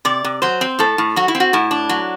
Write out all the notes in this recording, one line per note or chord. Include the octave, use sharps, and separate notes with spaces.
C3 D5
C3
F#3 C5
C4
A2 A4
A2
F#3 F#4
E4
C4
F#4
A2 E4
D4
F#3